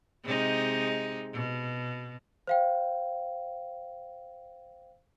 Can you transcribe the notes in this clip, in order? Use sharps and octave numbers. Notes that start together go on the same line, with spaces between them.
C3 G#3 D#4
B2
C5 F5 G5